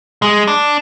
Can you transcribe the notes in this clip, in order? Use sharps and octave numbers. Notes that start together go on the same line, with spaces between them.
G#3
D4